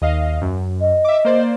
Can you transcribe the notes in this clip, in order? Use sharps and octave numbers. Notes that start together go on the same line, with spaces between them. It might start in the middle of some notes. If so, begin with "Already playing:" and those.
D#2 D#5 F5
F#2
D#5
E5 D6
A#3 C5 D5